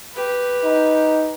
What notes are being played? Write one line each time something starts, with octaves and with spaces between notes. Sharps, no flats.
G4 B4
D#4